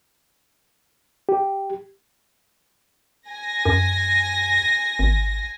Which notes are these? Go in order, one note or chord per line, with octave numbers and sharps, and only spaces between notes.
G4
G#5 A#6
F#2
G#1